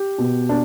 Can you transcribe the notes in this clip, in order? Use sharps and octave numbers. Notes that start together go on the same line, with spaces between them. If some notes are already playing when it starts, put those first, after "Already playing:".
Already playing: G4
B2
D4